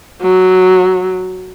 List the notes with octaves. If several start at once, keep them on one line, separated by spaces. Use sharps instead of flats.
F#3